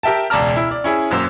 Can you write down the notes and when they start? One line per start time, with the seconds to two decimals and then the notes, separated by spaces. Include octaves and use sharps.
0.03 G4 A#4 E5 G5 A5
0.30 E1 C#2 D5 A5 A#5 F6
0.56 E4
0.71 D5
0.84 C#4 E4 G#4
1.10 G#1 F#2 A#3 C5 E6